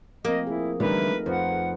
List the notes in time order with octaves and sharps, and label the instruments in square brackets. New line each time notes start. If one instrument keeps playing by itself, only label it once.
[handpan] F3 A3 C4 [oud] A#3 [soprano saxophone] D#5
[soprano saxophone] E4 [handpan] G#4
[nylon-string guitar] D3 E3 G3 [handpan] A3 D#4 A#4 [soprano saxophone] B4
[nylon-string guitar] F2 [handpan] F4 B4 [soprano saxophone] F#5